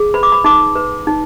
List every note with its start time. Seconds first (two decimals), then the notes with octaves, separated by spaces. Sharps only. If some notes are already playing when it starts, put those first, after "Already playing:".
Already playing: G#4
0.14 B4 B5
0.23 D6
0.32 B5
0.44 D#4 D6
0.76 B4
1.07 D#4